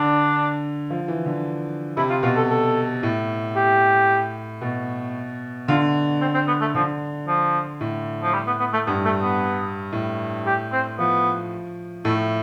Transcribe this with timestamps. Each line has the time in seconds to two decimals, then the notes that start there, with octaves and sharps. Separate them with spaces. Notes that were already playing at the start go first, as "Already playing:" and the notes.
Already playing: D3 D4
0.90 F3
1.08 E3
1.26 D3
1.97 C3 E4
2.10 F4
2.23 B2 F4
2.36 A4
2.50 A4
3.03 A2
3.56 G4
4.61 B2
5.68 D3 F4
6.21 C4
6.34 C4
6.48 B3
6.61 A3
6.75 D3 F3
7.27 F3
7.81 A2
8.23 F3
8.34 G3
8.47 B3
8.60 B3
8.73 A3
8.87 G2 B3
9.05 A3
9.22 B3
9.92 A2
10.46 G4
10.72 C4
10.99 F3 B3
12.05 A2 A3